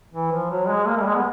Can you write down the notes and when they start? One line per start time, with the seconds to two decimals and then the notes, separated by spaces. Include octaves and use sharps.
0.13 E3
0.32 F3
0.51 F#3
0.69 G#3
0.87 A#3
0.96 A3
1.01 G3
1.06 G#3
1.15 B3